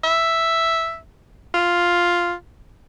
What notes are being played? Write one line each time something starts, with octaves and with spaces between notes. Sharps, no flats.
E5
F4